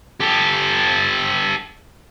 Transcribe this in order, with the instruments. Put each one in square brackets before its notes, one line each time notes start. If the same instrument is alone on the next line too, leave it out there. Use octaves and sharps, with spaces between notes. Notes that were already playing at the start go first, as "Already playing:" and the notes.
[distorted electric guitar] G4 A4